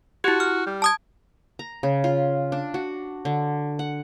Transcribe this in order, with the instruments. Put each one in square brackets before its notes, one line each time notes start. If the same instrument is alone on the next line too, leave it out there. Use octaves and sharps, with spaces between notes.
[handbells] E4 G4 [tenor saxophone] F#4
[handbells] F6
[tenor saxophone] G3
[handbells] A5 D#6 G#6
[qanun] A#5
C#3
F4
D4
F#4
D3
F#5